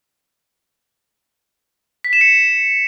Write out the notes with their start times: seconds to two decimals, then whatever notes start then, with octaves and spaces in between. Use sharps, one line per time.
2.04 B6
2.13 E7
2.21 C#7